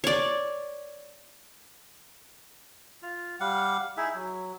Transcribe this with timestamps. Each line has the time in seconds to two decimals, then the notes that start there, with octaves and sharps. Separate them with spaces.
0.04 C#5 D5
3.02 F4
3.40 G3 F5 F#5
3.97 D#4 E4 G#4 E5
4.15 F#3